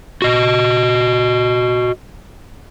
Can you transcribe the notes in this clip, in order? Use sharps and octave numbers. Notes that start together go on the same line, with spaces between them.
F#4 D#5